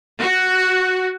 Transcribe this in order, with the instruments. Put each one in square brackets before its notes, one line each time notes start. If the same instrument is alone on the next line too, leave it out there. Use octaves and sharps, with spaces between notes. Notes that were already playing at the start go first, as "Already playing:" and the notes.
[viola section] F#4